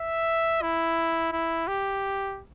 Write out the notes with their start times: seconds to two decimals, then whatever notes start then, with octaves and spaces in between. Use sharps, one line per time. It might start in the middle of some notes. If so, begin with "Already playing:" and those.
Already playing: E5
0.62 E4
1.32 E4
1.68 G4